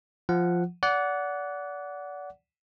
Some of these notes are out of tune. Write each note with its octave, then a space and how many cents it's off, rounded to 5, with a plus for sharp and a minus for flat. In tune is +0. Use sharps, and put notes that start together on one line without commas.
F3 +0 F#5 +0
D5 -30 F#5 +0